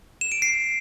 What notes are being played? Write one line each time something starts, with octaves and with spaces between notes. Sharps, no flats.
E7
D7
C7